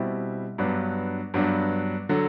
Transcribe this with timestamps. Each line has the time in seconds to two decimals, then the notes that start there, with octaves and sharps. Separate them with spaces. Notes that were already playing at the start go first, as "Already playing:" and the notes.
Already playing: B2 G3 C4 E4
0.58 G2 F#3 B3 D4
1.34 G2 F#3 B3 D4
2.09 D3 F#3